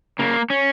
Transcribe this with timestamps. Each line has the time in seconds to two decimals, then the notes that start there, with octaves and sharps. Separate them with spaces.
0.19 C#3 A#3
0.50 C#4